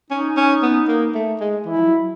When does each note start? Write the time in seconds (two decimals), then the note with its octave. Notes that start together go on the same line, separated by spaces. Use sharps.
0.10 C#4 D#4
0.37 C#4
0.62 B3
0.88 A#3
1.15 A3
1.40 G#3
1.66 E3 E4
1.77 F3
1.85 F#3